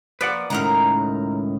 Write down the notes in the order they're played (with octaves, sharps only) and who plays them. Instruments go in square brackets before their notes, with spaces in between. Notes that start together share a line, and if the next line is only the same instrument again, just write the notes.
[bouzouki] F3 A#3 [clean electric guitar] B4 D5 F#5
[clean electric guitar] C#2 A2 D#3 [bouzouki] A#4 F#5 A#5